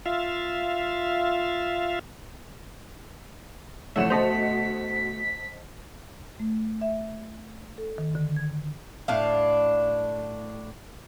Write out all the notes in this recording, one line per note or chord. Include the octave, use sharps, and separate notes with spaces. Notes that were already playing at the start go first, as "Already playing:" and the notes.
F4 E5 F5
F2 A#2 E3 A3 C#5 E5 F#5 E7
D2 B2 C5 D#5 A5 B6 F7
A3
E5
A4
D#3
D3
G#6
A2 D4 F5